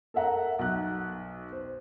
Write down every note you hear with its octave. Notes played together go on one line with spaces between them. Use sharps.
A4 A#4 E5 F#5 A#5
B1 F#6
C5